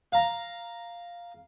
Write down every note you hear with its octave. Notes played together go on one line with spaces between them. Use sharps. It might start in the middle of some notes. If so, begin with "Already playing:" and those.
F5 A#5